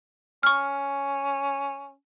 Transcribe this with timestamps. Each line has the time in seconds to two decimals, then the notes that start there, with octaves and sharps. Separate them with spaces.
0.43 C#4 C#6 F6